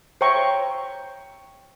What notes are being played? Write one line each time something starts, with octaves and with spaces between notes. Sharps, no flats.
C5 C#5 E5 G5 A#5 C#6